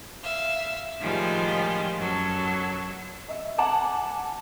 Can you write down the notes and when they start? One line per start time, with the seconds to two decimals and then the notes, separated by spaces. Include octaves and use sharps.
0.23 E5 F5
0.99 A2 D#3 F3 G3 G#3 F4
1.97 F#2 F#3 A4
3.29 D#5 E5
3.58 F#5 G#5 A5 D6